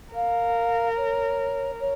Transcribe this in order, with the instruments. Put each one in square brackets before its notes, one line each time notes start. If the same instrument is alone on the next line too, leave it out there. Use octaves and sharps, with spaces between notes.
[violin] A#4 [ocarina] F5
[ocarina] C#5
C#5